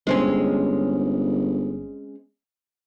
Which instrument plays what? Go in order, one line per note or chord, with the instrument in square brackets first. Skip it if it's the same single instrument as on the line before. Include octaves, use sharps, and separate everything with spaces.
[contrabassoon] G1 [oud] G#3 C4 C#4